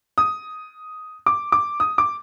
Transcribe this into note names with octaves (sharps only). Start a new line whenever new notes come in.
D#6
D6
D6
D#6
D6